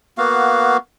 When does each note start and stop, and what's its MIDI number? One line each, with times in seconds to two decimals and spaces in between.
0.18 0.77 58
0.18 0.77 59
0.18 0.77 66
0.18 0.77 77